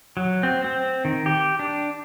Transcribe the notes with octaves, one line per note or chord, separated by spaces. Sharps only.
F#3
C4
C4
D#3
G4
D4